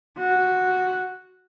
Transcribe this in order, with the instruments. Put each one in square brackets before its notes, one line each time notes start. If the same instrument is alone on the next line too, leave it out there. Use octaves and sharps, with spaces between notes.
[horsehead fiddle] F#4